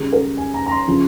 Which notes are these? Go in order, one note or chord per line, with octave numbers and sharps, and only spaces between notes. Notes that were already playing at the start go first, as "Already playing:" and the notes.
Already playing: C#2 C#3 G3 G#4
A#4
G#5
A#5
A#5
C6
C#3 F3